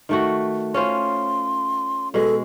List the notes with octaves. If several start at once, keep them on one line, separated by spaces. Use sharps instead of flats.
D#3 A3 F#4
C#4 F4 C5 C6
B2 G#3 A4